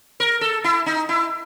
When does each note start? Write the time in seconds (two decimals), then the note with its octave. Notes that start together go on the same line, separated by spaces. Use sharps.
0.20 A#4
0.41 A4
0.64 E4
0.86 D#4
1.09 E4